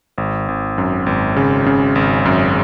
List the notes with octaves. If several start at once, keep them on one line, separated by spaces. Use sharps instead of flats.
G#1
G#1
F#2
G#1
C#3
C#3
G#1
F#2